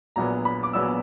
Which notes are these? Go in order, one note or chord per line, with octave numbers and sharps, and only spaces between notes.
A#1 A#2 F#3 B3 D4 A#5
B5
D6
A#1 A#2 F#3 B3 D4 E6